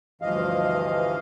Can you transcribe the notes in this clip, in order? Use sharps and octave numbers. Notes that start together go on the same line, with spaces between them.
D2 G2 E3 F3 D#5 F5